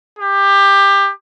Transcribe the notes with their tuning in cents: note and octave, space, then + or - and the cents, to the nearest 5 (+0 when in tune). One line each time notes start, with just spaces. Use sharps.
G4 +20